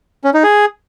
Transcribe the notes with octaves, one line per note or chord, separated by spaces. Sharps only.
C#4
D#4
G#4